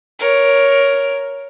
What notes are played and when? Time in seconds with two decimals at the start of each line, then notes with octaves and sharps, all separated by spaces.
0.19 A#4 C#5